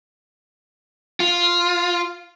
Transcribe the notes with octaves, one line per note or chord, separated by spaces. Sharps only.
F4